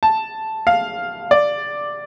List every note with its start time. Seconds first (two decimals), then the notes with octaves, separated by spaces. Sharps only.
0.03 A5
0.67 F5
1.31 D5